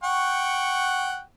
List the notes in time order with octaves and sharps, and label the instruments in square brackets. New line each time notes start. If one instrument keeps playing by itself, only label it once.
[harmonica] F#5 G5 C#6